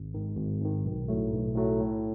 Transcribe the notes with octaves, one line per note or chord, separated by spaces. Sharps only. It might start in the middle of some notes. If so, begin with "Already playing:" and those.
Already playing: G#1
G#2 D#3
G#1
G#2 D#3
B1
A2 F#3 A3
B1
A2 F#3 A3
A2